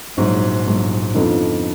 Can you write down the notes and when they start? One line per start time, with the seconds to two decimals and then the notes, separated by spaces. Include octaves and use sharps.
0.17 A#1 G#2 F#3
0.66 A#1 G#2 F#3
1.14 F2 D3 F3 B3 D#4